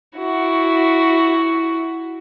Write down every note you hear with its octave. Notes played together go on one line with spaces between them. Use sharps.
E4 F#4